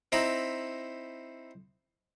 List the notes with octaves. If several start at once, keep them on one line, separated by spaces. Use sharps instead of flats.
C4 D#4 E4 A#5 B5